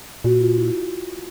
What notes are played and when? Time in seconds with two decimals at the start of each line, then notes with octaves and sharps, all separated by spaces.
0.24 A#2 F#4
0.41 F4
0.57 E4